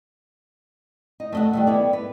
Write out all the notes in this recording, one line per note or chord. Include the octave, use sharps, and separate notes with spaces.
D#4
A3 D#5 F#5
D#3 G3 A3
B3 E4 D5
B4